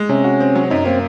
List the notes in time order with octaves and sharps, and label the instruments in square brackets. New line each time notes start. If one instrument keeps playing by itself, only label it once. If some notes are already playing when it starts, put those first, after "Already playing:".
Already playing: [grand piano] G#3
[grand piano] C3 [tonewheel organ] C#4
[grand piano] F#4
C4
F#3
[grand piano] F#2 [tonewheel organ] D#4
[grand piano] A#3 [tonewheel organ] C4